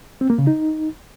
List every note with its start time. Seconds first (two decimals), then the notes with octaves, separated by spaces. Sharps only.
0.21 C4
0.30 A#3
0.38 C#3
0.47 D#4